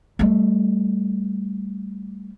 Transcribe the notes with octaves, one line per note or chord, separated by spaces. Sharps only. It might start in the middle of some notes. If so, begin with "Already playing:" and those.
G3 A3